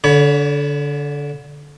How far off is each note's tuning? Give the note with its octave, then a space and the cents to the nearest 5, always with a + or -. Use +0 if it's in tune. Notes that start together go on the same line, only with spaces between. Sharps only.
D3 -20 C#5 +30 B5 +0